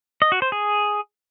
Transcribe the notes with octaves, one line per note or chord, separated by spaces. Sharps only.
D#5
F#4
C5
G#4